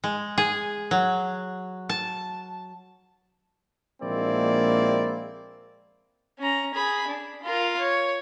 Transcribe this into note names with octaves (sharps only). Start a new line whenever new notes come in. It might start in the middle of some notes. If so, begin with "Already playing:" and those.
G#3
G#4
F#3
A5
A#1 G#3 A#3 C4 E4 D5
C#4 A#5
G#4 B5
D4
F4 A#4
C#5